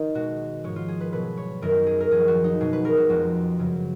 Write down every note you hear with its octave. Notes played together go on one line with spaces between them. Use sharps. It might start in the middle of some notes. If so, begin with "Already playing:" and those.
Already playing: D#3 D#5
B2 G#3 F#4
G#2 F3 G#3 C#5
F4
G#4
B4
B2 F#3 B4
C#5
F#2 D#3 G#3 A#4
G#4
A#4
F#2 F3 G#3 G#4
F#4
D#4
B2 G#3 G#4
B4
A#4
F#4
F2 F3 G#3 F#4
F#2 C#3 F#3